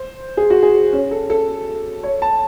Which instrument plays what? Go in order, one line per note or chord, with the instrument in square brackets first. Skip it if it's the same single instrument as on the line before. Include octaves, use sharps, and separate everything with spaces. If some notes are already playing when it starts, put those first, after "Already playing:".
Already playing: [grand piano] C5
G#4
F#4
G#4
C#4
A4
A4
C#5
A5